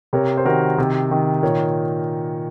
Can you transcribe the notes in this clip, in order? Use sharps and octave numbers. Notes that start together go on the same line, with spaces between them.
C3 A#4 C#5
C5
D#3 F#4 A#4
C3
D#3
A#2 A#4 C#5